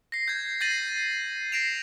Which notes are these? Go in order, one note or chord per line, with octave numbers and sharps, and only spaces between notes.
A#6 C7
G6 G#6
G6 A6 A#6 C7 D#7 F#7
A#6 C7 D7 E7 F7